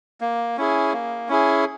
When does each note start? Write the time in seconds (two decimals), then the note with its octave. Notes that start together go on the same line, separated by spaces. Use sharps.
0.21 A#3
0.57 C#4 E4 G#4
0.93 A#3
1.29 C#4 E4 G#4